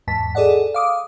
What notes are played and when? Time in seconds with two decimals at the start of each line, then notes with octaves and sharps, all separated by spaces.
0.08 E2 G#2 A5 B6
0.35 G#4 A4 D5 D#5 F#5
0.74 F5 D6 D#6